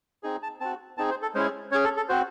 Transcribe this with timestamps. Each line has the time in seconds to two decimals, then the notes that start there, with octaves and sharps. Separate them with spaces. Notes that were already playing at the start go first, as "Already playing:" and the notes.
0.23 C4 D#4 G#4
0.43 A5
0.60 C4 F#4 A5
0.97 C4 D#4 G#4 A5
1.10 C5
1.22 A4
1.35 G#3 C#4 E4 G#4 C5
1.71 C#4 C#5
1.75 G#4
1.84 A4
1.97 A4
2.09 C4 F#4 C5